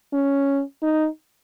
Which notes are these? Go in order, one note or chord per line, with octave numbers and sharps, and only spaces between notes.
C#4
D#4